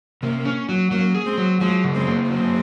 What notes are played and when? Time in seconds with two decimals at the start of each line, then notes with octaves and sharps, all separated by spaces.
0.23 C3 A#3 C#4
0.45 C#4
0.69 F#3
0.91 F#3 A#3 C#4
1.14 G#4
1.26 G#3 C4
1.38 F#3
1.61 F3 F#3 G#3
1.84 C#3
1.95 G#3 C4
2.07 A#3
2.30 F#3 G#3 C4